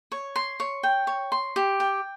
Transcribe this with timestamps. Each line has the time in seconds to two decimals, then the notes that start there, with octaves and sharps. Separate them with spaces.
0.12 C#5
0.36 C6
0.60 C#5
0.83 G5
1.07 C#5
1.32 C6
1.56 G4
1.80 G5